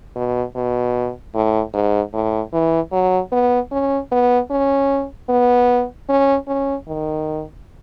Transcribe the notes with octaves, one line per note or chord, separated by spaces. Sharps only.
B2
B2
A2
G#2
A2
E3
F#3
B3
C#4
B3
C#4
B3
C#4
C#4
D#3